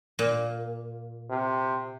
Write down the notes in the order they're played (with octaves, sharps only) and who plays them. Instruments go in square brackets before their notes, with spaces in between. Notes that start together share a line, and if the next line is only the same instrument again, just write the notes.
[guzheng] A#2
[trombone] C3